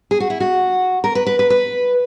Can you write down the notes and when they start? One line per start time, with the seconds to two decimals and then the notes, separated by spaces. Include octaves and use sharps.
0.11 G#4
0.20 F#4
0.30 E4
0.40 F#4
1.04 A#4
1.15 B4
1.27 B4
1.39 B4
1.50 B4